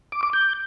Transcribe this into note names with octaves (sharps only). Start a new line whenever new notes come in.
D6
D6
G6